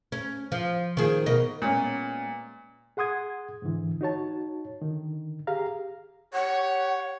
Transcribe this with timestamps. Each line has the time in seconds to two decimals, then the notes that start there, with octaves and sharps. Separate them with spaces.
0.12 C#4
0.52 F3
0.97 D#3 G#4
1.26 B2 A#4 D#5
1.62 A#2 G#3 B3 C#4
2.97 G#4 F#5 C6 D#6 G#6
3.62 G#2 D3 E3
4.01 D#4 F#4 C#5 A5
4.82 D3 D#3
5.47 G4 G#4 F5 A#5
6.33 G4 C#5 F#5